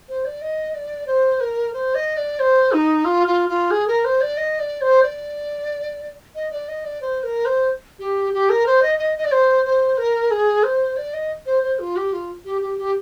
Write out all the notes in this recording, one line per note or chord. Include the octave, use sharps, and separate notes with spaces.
C5
D5
D#5
D5
C5
A#4
C5
D#5
D5
C5
D#4
F4
F4
F4
G#4
A#4
C5
D5
D#5
D5
C5
D5
D#5
D5
D#5
D5
C5
A#4
C5
G4
G4
A#4
C5
D#5
D#5
D#5
D5
C5
C5
A#4
G#4
C5
D5
D#5
C5
C5
F4
G4
F4
G4
G4
G4